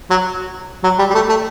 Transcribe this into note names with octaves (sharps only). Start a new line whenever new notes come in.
F#3
F#3
G3
G3
A3
A3